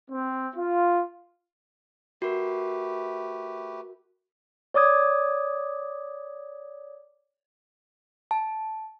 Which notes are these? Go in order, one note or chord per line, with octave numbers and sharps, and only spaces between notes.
C4
F4
A3 F#4 G4 A#4 B4
C#5 D5 D6 D#6 G#6
A5